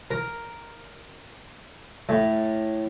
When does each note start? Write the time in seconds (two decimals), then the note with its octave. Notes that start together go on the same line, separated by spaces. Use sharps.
0.11 A#4
2.09 A2